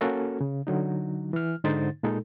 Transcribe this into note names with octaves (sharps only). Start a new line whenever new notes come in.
A#3 C#4 F#4 A4 A#4
C#3
D3 F#3 D#4
E3 F6
G#2 D3 D#4 C5 A6
A#2 G#3 D#4 A4